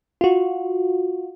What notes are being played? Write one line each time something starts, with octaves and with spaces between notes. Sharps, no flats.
F4 F#4